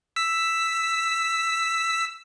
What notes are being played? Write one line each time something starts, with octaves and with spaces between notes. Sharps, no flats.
E6 B6